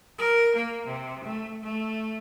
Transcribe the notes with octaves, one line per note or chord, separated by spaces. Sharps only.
A#4
A#3
C3
A3
A3